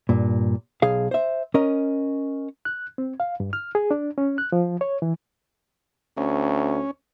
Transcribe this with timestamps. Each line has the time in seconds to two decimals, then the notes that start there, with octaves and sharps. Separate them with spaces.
0.09 G2 A#2
0.82 B1 G#4 F5
1.11 C5 E5
1.54 C#4 A#4 D#5
2.65 F#6
2.98 C4
3.20 F5
3.40 G2
3.53 F6
3.75 G#4
3.91 D4
4.18 C#4
4.38 F#6
4.52 F3
4.81 C#5
5.02 E3
6.17 D2 C#4